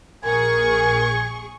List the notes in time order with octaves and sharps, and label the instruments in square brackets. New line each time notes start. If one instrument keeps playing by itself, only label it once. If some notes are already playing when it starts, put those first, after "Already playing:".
[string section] A#1 G#4 C#6 [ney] A#4 [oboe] G#5